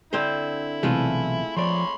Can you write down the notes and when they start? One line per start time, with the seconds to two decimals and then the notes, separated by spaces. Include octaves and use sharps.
0.13 D3 C4 E4 C5
0.83 B1 C3 E3 G#3 A3 F4
1.57 F3 C#5 D5 B5 C6